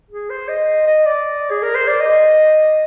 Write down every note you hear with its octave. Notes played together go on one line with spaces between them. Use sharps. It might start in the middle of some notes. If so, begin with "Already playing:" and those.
G#4
C5
D#5
D#5
D5
G#4
A#4
C5
D5
D#5